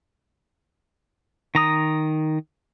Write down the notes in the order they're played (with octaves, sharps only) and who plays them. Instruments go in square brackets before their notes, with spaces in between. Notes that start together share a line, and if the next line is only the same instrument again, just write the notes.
[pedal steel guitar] D#3 A#5 D#6